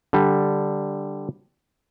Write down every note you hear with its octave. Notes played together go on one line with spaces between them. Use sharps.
D3 G3